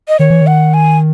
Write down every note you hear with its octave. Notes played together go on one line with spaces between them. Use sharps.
D#5
D#3 C#5
E3
D#3
F#5
G#5